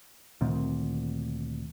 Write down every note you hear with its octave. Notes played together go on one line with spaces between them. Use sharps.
D2 A#2 D#3 C4